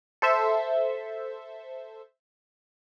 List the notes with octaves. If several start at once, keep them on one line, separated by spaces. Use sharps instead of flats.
A4 C5 E5